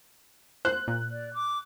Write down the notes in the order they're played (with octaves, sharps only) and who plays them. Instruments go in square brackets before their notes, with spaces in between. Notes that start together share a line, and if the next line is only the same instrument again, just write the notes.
[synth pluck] C5 [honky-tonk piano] F#6
[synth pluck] A#2
[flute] D5
D6